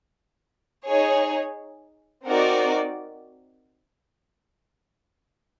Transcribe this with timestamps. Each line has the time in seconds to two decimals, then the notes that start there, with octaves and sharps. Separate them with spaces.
0.85 D#4 G#4 C#5
2.24 C4 D#4 F#4 A#4 D5